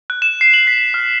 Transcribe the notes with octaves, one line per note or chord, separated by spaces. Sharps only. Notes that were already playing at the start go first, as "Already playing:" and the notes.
F#6
E7
C7
F#7
B6
F6